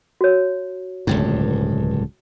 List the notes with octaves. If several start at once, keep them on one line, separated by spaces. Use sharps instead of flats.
F#4 C#5
D1 C#2 G2